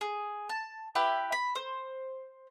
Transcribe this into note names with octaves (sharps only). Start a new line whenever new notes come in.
G#4
A5
E4 G4 B4 G5
B5
C5